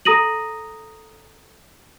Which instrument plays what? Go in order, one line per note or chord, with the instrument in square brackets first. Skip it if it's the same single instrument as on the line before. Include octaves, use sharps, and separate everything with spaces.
[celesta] A4 A#5 D#6 A#6 D#7 F#7